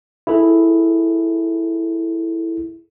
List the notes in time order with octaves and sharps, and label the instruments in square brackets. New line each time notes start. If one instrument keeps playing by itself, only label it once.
[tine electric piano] E4 G#4 A4